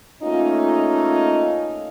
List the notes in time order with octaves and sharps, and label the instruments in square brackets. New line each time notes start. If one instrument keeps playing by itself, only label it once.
[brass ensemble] A3 A#3 C#4 D#4 F4